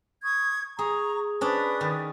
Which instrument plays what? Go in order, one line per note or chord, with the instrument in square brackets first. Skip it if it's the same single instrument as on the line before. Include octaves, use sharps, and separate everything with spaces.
[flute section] C#6 D#6 G#6
[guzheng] G#4 [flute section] A#5 C#6
[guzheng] C#4 D4 [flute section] B4 D5 D#6
[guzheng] D#3